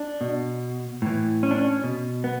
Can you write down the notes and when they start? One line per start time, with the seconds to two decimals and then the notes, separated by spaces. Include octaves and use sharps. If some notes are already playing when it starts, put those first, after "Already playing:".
Already playing: D4
0.21 B2
1.02 A2 E3
1.43 C#4
1.51 D4
1.58 C#4
1.84 B2
2.24 B3